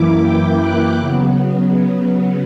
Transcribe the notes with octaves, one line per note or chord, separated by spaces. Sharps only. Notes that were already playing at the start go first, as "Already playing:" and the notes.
Already playing: F#2 E3 A#3 E4 D6
G5
F#6
C#3 F#3 B3